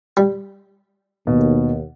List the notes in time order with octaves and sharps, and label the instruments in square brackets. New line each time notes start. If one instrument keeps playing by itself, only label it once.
[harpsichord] G3
[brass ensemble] D#2 [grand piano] B2